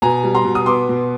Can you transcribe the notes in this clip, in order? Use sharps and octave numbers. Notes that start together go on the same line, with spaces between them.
B2 G#5 A#5
G3
A#5 C6
B2
D#6
B3 C6 D6
B2